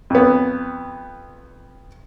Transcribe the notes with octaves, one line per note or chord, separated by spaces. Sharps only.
F2 B3